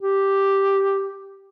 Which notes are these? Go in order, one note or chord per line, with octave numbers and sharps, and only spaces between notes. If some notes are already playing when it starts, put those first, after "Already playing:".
G4